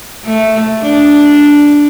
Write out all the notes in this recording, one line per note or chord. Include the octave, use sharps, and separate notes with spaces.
A3
D4